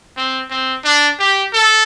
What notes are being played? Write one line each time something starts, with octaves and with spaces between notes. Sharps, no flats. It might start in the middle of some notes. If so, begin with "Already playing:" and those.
C4
C4
D4
G4
A4